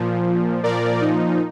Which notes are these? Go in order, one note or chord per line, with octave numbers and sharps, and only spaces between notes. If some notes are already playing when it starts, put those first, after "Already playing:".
Already playing: A#2 F3
A#2 F3 A#4 D5
D#4